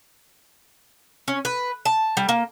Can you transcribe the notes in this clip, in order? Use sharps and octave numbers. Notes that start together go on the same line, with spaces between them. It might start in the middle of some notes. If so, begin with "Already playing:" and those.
C#4
B4
A5
G3
A#3